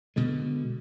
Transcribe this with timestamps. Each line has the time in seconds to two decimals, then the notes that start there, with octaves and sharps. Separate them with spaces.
0.16 B2 D3 G#3